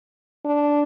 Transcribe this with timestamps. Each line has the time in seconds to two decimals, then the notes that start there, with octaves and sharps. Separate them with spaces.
0.45 D4